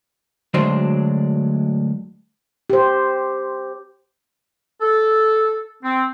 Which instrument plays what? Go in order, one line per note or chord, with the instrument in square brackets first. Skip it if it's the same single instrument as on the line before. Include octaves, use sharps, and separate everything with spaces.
[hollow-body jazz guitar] D2 F#3 G#3 D4 C5 C6
[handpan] G4 C5
[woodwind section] A4
C4